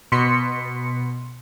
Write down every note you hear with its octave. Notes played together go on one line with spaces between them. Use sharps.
B2 C6 B6 C#7